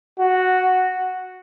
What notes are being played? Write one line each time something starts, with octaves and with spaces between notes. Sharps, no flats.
F#4